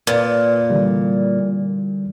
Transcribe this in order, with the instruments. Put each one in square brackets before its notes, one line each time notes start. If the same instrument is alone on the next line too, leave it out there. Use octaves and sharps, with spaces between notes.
[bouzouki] A#2 [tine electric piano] A#4 B4 D5
[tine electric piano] D3 E3 G3